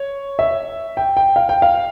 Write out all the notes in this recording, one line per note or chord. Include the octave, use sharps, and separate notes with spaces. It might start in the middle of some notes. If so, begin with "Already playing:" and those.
Already playing: C#5
E5
G5
G5
F5
G5
F5